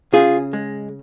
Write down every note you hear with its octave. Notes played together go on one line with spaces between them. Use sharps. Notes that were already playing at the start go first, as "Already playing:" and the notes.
C#3 F4 G#4
G#3